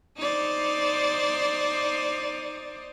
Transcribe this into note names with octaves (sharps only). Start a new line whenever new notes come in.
D#4 C5 D5